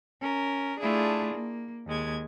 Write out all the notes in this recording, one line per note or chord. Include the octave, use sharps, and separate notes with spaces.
C#4 A#4
A3 D4 E4 F4 G#4
A#3
D#2 G#3 G#6